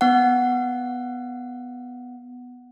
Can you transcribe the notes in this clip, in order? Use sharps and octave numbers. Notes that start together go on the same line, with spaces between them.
B3 F#5